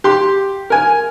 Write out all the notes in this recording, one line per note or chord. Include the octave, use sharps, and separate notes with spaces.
G4 C6
A#4 G#5